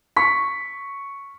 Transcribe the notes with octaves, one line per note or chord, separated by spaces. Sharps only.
C#6 B6